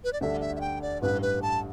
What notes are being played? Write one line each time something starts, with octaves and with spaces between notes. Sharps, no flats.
B4
D5
D2 D3 G3 D4 A4 E5
E5
E5
G5
D5
A1 G2 G3 B4
B4
A5